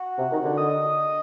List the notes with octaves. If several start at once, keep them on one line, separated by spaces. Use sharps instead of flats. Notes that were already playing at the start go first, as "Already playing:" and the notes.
Already playing: F#4
C3
D#3
D3
D#5